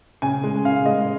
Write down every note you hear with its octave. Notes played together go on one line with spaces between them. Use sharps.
C#3 G#5
G#3
C#3 F5
G#3 D#5